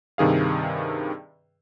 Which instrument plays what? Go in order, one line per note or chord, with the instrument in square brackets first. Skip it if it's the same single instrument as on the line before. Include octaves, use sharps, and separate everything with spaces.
[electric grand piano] G2 C3 D#3 G#4 F5